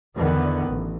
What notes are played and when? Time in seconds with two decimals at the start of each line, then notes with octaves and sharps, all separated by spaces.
0.16 E2 D3 D#3 B3
0.66 A1